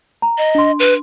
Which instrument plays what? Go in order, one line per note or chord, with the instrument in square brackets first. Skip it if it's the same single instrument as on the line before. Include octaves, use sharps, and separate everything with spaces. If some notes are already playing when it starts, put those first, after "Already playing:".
[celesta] A#5
[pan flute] D#5
[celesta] D4 C6
[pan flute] B4